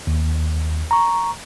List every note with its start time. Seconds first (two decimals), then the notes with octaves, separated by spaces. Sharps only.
0.07 D#2
0.91 A#5 C#6